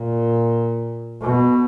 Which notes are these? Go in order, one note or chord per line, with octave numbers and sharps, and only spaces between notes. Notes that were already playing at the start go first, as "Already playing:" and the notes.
Already playing: A#2
B2